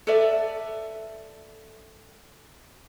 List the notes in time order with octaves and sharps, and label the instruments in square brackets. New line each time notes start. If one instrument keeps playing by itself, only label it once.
[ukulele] A4 B4 D5 E5